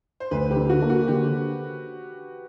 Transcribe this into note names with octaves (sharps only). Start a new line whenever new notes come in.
C5
D2 B4
G4
D3
F#4
A#3
F#4
D3 G4